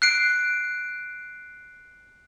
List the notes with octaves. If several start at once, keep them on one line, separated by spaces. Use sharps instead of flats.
F#6 C7 D7